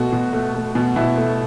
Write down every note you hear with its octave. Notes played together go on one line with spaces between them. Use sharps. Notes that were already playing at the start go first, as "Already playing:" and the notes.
Already playing: B2 A3 F#4
B2
A3
A3
B2
B2 E4
A3